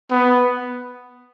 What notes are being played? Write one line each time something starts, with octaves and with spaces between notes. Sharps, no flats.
B3